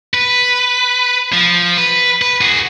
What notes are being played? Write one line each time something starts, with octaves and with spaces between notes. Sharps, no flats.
B4
F3
B4
B4
F#4 G#4